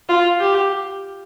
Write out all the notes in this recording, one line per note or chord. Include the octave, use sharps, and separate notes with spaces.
F4
G4